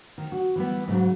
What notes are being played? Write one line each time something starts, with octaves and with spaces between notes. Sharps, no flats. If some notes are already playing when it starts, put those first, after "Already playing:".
D#3
F#4
E3 G3 B3
G#2 C#3 F#3